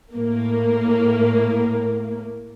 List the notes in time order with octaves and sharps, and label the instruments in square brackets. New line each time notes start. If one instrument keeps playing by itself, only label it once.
[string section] A2 A#3